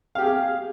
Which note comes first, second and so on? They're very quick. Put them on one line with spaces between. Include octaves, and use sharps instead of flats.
F5 G4 G#4